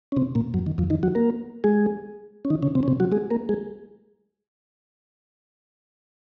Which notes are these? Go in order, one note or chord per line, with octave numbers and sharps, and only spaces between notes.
C#4
C3 C4
A#2 A#3
F#2 F#3
D#3
F2 F3
D#3 D#4
F#3 F#4
A#3 A#4
G#3 G#4
C#4
D#3 D#4
C#3 C#4
C3 C4
C#4
C3 C4
F#3 F#4
G#3 G#4
A#3 A#4
G#3 G#4